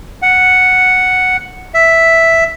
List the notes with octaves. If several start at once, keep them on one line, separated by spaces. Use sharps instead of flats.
F#5
E5